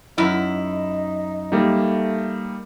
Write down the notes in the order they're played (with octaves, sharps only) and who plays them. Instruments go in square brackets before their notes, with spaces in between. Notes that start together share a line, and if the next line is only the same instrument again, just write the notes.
[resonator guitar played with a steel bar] F#2 E4 [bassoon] D#4
[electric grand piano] G3 A#3 D#4 [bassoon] A3